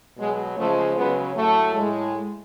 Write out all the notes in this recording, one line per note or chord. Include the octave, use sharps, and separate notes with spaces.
B2 F#3 G#3
C#3 F3 G#3 A3
C#3 F#3 G#3 B3
A2 F#3 A3
A2 G#3